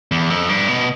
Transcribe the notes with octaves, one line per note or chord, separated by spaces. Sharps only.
E2
F2
G2
B2